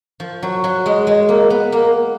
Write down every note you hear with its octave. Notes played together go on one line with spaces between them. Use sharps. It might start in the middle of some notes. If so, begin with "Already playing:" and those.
F3
F#3
F#3
G#3
G#3
A#3
B3
A#3